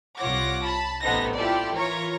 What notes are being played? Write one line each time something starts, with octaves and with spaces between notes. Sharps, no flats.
C2 F4 C#5 F#5 D6 A#6
A5 B5
A1 C3 B3 D#4 A4 A#6
E4 F4 G4 A4 D5
E3 F4 A#4 C#5 A#5